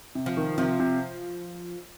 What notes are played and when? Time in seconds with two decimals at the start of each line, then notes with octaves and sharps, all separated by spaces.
0.15 C3
0.26 F3
0.37 D#3
0.58 C3 F3
0.80 C3